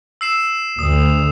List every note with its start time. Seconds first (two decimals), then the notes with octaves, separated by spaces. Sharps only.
0.21 E6 C7 E7
0.79 D2 D#6